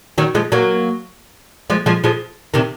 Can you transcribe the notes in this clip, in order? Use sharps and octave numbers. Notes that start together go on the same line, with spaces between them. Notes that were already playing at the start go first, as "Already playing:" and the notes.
D#3 F#3
F3 G#3
F#3 A#3
F3 G#3
F3 G#3
F3 G#3
C3 D#3